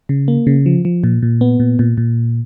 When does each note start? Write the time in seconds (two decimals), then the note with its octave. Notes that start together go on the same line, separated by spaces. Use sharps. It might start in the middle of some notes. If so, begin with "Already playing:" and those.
0.09 C#3
0.28 A#3
0.47 C#3
0.66 F3
0.85 F3
1.04 A#2
1.23 A#2
1.41 B3
1.60 A#2
1.79 A#2
1.98 A#2